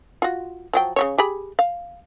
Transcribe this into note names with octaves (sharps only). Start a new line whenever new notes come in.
F4 F#4
F3 F#3 G5
C#3 G3 C#5
G4 G#4 B5
F5